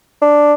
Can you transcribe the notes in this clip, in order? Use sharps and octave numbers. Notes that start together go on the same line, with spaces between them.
D4